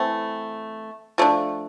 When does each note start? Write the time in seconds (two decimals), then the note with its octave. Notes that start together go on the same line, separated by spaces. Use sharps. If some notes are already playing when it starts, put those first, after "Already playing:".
Already playing: E3 A3 C4
1.18 F3 A3 D4